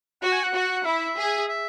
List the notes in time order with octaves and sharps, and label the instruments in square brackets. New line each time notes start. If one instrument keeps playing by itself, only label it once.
[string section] F#4 [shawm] F#5
[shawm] G#5
F#5
[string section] F#4
[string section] E4 [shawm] E5
[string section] G#4
[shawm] E5